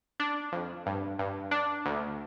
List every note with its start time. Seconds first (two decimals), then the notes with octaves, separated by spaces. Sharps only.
0.20 D4
0.52 F2
0.86 G2
1.19 G2
1.51 D4
1.85 D2